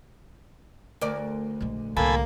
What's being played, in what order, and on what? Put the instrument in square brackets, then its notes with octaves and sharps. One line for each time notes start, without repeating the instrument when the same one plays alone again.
[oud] D2 A#4 D5
[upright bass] A#1 G#3
[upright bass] C2 D3 [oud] A2 [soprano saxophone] A#3 [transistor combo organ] A4 G#5 B5